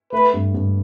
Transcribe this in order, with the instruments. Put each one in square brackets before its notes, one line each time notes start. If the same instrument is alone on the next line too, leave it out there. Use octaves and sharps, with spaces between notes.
[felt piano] A3 [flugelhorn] B4
[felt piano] G2
G2